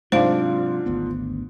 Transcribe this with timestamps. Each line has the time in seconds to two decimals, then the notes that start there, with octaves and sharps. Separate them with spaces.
0.12 G#2 C3 F#3 D4 F4 C5 F5
0.86 G#1 D2 B3